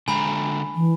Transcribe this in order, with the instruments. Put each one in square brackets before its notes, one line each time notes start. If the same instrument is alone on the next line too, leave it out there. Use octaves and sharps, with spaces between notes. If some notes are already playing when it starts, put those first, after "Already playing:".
[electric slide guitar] D3 G#3 A#5 [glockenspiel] G#5 B5
[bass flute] E3